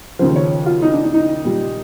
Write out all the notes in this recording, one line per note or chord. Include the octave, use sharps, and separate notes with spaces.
D#2 C#3 F3 C5
C#5
F4
D#4
D4
D#4
D#4
A#2 G3